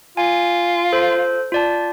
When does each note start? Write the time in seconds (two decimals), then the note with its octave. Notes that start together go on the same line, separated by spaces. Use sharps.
0.17 F4 G#5
0.93 A4 C5
1.52 F4 D5 A5